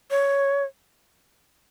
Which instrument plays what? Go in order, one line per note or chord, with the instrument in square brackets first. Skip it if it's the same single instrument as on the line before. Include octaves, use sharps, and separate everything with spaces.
[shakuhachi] C#5